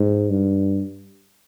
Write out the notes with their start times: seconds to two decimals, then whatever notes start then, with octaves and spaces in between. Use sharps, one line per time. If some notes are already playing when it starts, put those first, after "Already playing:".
Already playing: G#2
0.30 G2